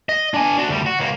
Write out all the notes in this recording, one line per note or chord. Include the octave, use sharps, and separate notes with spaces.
D#5
D4 G#5
D4 F#4
D2 G3
F#4
C#2 A#3